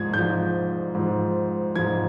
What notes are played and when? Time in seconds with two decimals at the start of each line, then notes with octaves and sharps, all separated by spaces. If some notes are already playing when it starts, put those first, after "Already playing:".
Already playing: G#2 F3 G#6
0.13 G#2 F3 G6
0.95 G#2 F3
1.76 G#2 F3 G#6